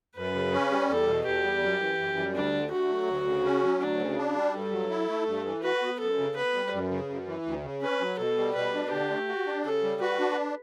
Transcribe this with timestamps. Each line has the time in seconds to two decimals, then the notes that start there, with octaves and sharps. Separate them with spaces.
0.16 F#2 B4
0.35 C#3
0.53 C#4
0.71 G3
0.89 E2 A4
1.08 B2
1.26 E2 G4
1.44 G3
1.62 F#2
1.80 E3
1.98 F#2
2.17 G3
2.35 D2 D4
2.54 D3
2.72 A3 F#4
2.90 F#3
3.08 D2
3.27 C#3
3.45 C#4
3.63 F#3
3.81 D2 D4
4.00 C#3
4.18 D4
4.36 G3
4.54 G2 A4
4.73 F#3
4.90 E4
5.09 A3
5.27 G2
5.46 E3
5.63 F#4 B4
5.82 B3
6.00 F#2 A4
6.18 C#3
6.36 B3 B4
6.55 G3
6.73 F#2
6.91 C#3
7.09 F#2
7.27 E3
7.46 D2
7.64 C#3
7.82 C#4 B4
8.01 F#3
8.19 B2 A4
8.38 G3
8.55 B2 B4
8.74 D4
8.92 D3 G4
9.10 A3
9.28 F#4
9.46 D4
9.64 C#3 A4
9.83 G3
10.01 F#4 B4
10.19 D4